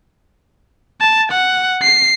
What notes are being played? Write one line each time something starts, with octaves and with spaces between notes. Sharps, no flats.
A5
F#5
C7